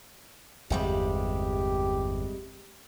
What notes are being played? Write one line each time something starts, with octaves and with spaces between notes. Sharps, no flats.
G1 E2 C3 G3 G#3 G4